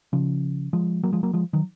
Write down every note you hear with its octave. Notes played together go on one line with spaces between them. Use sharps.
C#3 F3
F3 G#3
F#3 A#3
F3 G#3
F#3 A#3
F3 G#3
D#3 F#3